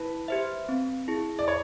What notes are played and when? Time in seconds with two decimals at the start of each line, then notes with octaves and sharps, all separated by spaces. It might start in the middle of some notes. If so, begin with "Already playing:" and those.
Already playing: E4 B4
0.28 G4 C5 E5
0.69 C4
1.08 E4 G#4
1.39 D5
1.48 C#5